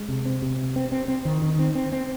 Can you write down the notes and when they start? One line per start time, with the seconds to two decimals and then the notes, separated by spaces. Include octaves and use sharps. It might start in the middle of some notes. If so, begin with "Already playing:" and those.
Already playing: G#3
0.09 C3
0.25 C4
0.42 C3
0.58 C4
0.76 C4
0.92 C4
1.08 C4
1.25 D#3
1.42 D#3
1.59 C4
1.75 C4
1.92 C4